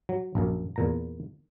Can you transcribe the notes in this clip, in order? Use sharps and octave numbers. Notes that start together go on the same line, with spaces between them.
F#3
A#1 F#2
E2 A#2 A#5